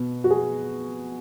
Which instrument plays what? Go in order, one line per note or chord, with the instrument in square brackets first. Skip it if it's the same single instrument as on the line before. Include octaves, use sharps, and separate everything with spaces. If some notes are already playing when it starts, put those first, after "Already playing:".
Already playing: [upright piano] B2 B3
F#4
G#4